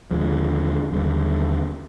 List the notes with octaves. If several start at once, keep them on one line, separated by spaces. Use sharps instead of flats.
D#2 D3 F3 G#3
D#2 D3 G3